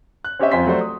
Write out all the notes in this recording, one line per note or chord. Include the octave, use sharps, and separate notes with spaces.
F#6
C4 C#4 G4 C#5 D#5 E5
F2 F4 C5 G#5 C6 B6
F#3 A3 F#4 G4 C5 D5
D#6